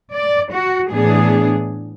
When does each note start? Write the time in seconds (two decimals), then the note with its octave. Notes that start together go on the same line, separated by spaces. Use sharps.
0.14 D5
0.53 F#4
0.91 A2 E3 B3 D4 G#4